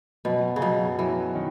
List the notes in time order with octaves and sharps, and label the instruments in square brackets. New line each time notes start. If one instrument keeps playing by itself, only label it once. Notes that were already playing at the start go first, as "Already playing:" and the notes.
[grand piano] F#2 [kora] B2
[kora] C#3
[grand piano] F#2 [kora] B2
[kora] E3 [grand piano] F#3
[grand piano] D#3